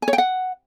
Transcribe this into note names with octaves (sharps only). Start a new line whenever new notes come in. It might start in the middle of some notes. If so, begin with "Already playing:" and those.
G#5
C#5
G5
F#5